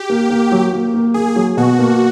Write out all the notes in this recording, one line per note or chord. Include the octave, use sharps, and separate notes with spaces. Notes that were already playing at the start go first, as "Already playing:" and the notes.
Already playing: G4
A#3
A#3
F#3
A#3
A#3
A#3 G#4
F#3
B2 F#4
A#3